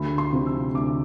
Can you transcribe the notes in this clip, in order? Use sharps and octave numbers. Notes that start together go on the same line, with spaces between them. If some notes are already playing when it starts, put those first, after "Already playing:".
Already playing: D2 B5
C6
C3 F3 C4
E6
D2 D6